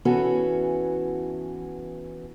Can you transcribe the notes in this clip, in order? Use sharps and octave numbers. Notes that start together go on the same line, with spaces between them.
E3 B3 C#4 F#4 G#4 A4